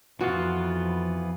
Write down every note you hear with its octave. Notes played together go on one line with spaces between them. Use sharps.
F2 E3 B3 F4 F#4